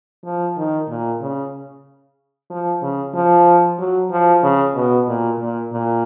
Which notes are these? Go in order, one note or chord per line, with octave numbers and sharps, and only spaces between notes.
F3
D#3
A#2
C#3
F3
C#3
F3
F#3
F3
C#3
B2
A#2
A#2
A#2